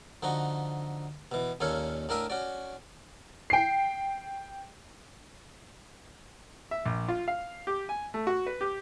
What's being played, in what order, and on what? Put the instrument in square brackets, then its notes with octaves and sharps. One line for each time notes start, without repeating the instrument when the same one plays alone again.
[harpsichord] D3 F3 D#4 F#4
B2 E3
D#2 A#2 C#4 A4 C#5 F5
A2 D4 A#4 E5 F5 D#6
C#4 F#4 D5
[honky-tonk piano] G5 C7
[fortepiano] E5
A#1
F4
F5
G4
G#5
A3
F#4
B4
G4